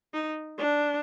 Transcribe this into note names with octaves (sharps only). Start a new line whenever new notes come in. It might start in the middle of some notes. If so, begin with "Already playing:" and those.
D#4
D4